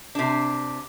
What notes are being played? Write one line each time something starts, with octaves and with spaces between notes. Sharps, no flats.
C3 D4